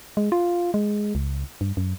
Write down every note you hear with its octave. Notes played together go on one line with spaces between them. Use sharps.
G#3
F4
G#3
C#2
G2
F#2